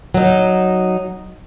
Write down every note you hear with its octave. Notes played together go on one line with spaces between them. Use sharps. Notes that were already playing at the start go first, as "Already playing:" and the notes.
F#3 D#4